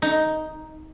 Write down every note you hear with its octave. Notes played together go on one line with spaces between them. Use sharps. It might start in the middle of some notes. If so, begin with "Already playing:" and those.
D#4